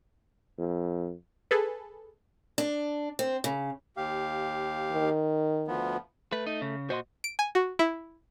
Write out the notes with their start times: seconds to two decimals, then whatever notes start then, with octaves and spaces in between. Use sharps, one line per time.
0.58 F2
1.51 G#4 A4 B4
2.58 D4
3.19 C4
3.44 C#3
3.97 D#2 G4 F5
4.92 D#3
5.68 D2 F3 B3
6.32 A3 B4
6.46 D#4
6.62 C#3
6.90 A#2 F#4 C5 D#5 C6
7.24 D7
7.39 G#5
7.55 F#4
7.79 E4